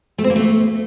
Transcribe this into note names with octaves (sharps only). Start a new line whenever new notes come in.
A3
C4
A#3
A3